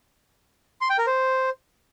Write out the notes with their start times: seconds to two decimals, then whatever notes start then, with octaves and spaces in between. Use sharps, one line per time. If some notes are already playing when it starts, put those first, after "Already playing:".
0.81 C6
0.90 G5
0.98 A#4
1.07 C5